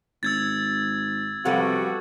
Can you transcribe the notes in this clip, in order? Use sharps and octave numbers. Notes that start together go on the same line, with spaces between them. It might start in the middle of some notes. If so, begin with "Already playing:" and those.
G#1 E6 G#6 A6
C3 F3 G3 B3 F#4 A4 F#5